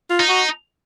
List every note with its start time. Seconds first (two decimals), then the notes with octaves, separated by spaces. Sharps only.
0.10 F4
0.20 D#4
0.29 F#4